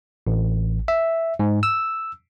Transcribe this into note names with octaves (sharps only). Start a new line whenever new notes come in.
A1
E5
G#2
E6